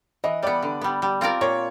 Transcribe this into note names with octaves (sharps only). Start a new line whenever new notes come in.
E3 D#5
G3 B3 D5
D3
G3 B3
G3
C4 F4 A#4 D5
A#2 C#5